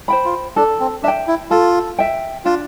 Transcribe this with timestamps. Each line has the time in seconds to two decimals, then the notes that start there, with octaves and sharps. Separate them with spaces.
0.08 C5 G5 B5
0.25 F4
0.56 D4 A4
0.80 C4
1.03 D4 E5 G5
1.28 E4
1.50 F4 A4
1.99 E5 G5
2.45 D4 F4